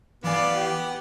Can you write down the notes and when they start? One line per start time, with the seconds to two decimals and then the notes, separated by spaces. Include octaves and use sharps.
0.24 E3 B3 D5 F5 G#5
0.56 G4